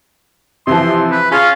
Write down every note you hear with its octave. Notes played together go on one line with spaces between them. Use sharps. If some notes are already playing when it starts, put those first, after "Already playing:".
C3 E3 F3 C6
B4
C#4 F4 G#4